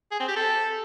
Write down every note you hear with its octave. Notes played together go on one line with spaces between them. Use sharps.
G#4
C4
G4
A4